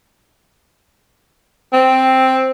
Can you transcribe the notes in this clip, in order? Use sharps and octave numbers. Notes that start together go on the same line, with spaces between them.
C4